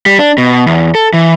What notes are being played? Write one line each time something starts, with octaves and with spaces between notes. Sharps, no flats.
G3
D4
B2
E2
A4
E3